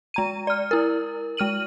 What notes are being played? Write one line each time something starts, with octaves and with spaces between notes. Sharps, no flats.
G#3 A#5 D#7
D5 F6
E4 A#4
G#3 F6 D#7 F#7